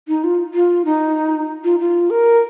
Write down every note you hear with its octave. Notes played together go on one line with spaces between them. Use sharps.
D#4
F4
F4
D#4
F4
F4
A#4